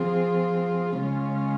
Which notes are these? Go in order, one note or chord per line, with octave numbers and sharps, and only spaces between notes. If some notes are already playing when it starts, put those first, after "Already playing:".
Already playing: F3 C4 F4 G#4
C#3 G#3 C#4 F4